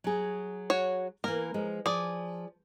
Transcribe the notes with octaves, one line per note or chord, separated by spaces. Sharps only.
F#3 G#4
F#4 C#5
E3 A#3 A#4
F3 G#3
F3 G#4 D5